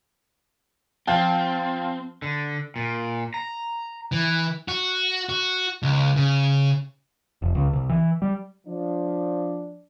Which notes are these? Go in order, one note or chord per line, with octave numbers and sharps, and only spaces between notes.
F3 C4 F4 G5
D3
A#2
A#5
E3
F#4
F#4
C#2
C#3
F1
C#2
C2
E3
G3
F3 D4